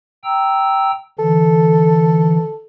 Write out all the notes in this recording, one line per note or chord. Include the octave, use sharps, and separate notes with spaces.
G5 A#5 E6
D3 E3 A4